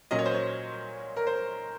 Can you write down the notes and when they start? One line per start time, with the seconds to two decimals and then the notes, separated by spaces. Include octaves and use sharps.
0.11 A#2 F#3 C#4 D#5
0.19 C#5
0.26 C5
0.34 C#5
1.17 A#4
1.27 C5